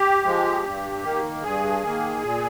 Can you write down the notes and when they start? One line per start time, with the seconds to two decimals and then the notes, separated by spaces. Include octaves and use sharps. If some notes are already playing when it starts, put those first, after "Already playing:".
Already playing: G4
0.24 F3 G#3
0.64 G2
1.04 D#3 A#3
1.44 G2 G#4
1.83 D#3 A#3
2.23 A#2